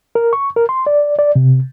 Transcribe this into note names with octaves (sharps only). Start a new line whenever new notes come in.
A#4
C#6
A#4
C6
D5
D5
C3